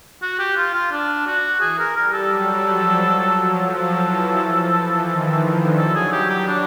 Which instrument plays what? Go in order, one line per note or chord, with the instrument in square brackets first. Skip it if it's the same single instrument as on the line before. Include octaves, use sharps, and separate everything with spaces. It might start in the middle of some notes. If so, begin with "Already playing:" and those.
[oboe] F#4
G4
F4
F4
D4
F#4
[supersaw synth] E3 [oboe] G#4
[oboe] A#4
[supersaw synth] G3 [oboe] A#4
[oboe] A4
[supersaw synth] F#3
F3
F#3
F3
[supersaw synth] F3 [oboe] A4
[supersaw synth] E3
F3
E3
D#3
D3
[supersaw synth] F#3 [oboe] A4
[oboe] G#4
[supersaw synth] G3 [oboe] G4
[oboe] G4
D4